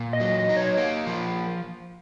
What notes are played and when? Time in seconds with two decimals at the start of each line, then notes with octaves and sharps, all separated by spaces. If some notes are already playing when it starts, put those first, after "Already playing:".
Already playing: A#2
0.13 D#5
0.20 F#3
0.35 D#5
0.49 D#4
0.57 C#5
0.77 A#3
1.07 F3